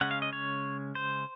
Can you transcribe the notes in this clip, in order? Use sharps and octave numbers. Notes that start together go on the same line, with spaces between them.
C#3 G#3 C#4 F#5
F5
D#5
C#5
C5